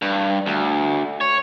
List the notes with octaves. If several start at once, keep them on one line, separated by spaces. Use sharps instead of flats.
G2
D2
C#5